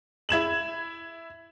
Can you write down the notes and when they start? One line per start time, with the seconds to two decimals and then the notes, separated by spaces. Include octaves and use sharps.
0.29 E4 G#6 E7 F#7